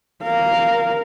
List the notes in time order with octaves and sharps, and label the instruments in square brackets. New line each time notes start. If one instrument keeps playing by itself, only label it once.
[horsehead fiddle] A#4 F5